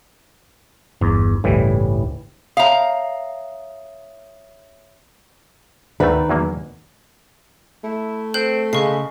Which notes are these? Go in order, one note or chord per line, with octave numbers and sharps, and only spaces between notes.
G1 E2
G1 C#2 A2 E3 G3
C#5 E5 F5 A#5 D#6
D2 D#3 A3 B4
E2 F#3 A#3
A3 E4
C4 A4 F#6 G6
C#3 G#3 F5 C#6 C7